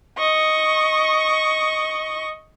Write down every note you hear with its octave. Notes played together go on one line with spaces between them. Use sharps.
D#5 C#6